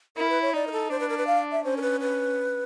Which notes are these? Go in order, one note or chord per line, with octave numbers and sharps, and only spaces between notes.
E4 A#4
B4
C#5
D#4 D5
A#4
A4
D4 C5
B4
A#4
B4
F5
E5
C#4 C5
A#4
B4
B4